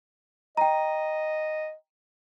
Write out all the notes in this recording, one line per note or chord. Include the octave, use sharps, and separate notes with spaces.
D#5 G5 A#5